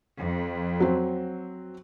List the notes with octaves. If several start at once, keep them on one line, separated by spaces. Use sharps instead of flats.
F2
F#3 C4